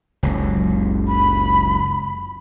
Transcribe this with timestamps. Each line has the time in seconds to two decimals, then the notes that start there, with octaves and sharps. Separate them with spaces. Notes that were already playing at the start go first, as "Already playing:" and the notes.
0.23 F#1 C#2 F#3
1.08 B5